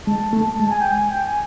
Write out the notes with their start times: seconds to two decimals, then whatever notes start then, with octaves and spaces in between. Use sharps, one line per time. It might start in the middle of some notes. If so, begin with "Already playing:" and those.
0.07 G#3 A5
0.33 A3
0.58 G#3 A5
0.70 G#5
0.80 G5
0.91 G#5
1.11 G5
1.25 G#5